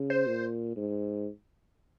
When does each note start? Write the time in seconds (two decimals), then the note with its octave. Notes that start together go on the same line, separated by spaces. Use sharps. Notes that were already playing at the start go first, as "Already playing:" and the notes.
Already playing: C#3
0.10 C5
0.27 A#2
0.76 G#2